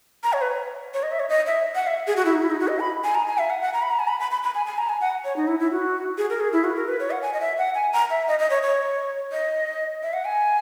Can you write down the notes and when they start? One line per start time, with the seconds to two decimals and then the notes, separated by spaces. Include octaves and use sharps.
0.23 A#5
0.33 C#5
0.41 B4
0.94 C#5
1.03 D#5
1.12 E5
1.19 C#5
1.29 D#5
1.46 E5
1.75 F#5
1.87 E5
2.07 G#4
2.16 F#4
2.25 E4
2.34 D#4
2.42 E4
2.50 D#4
2.60 F#4
2.68 D#5
2.80 B5
3.04 G#5
3.15 A#5
3.27 G#5
3.38 E5
3.50 F#5
3.62 F#5
3.73 A#5
3.82 B5
3.91 A#5
3.99 G#5
4.08 B5
4.20 B5
4.31 B5
4.43 B5
4.55 G#5
4.66 G#5
4.78 A#5
4.89 G#5
5.01 F#5
5.25 C#5
5.36 D#4
5.48 E4
5.60 E4
5.71 F#4
6.18 G#4
6.30 A#4
6.40 G#4
6.53 E4
6.64 F#4
6.76 A#4
6.88 B4
7.00 C#5
7.11 F#5
7.22 G#5
7.33 D#5
7.40 E5
7.58 F#5
7.75 G#5
7.93 A#5
8.10 E5
8.28 D#5
8.39 D#5
8.50 C#5
8.62 C#5
9.32 D#5
10.03 E5
10.13 F#5
10.25 G#5